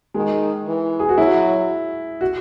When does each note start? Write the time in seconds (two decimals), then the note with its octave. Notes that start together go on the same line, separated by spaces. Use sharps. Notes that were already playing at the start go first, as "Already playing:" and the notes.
0.14 D#3 G#3
0.67 E3
1.00 G#4
1.09 F#4
1.18 F#3 E4
2.21 F#4